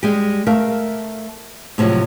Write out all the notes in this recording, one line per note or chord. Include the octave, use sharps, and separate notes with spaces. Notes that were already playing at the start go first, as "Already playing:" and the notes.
G3 G#3 G4
A3 A#4 E5 F5
A2 C3 F3 F#3 G#3